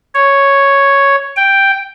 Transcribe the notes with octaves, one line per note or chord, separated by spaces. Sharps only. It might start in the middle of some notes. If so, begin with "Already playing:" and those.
C#5
G5